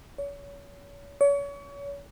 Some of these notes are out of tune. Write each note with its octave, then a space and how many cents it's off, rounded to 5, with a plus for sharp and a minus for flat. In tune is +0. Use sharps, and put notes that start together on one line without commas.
C#5 +35
C#5 +35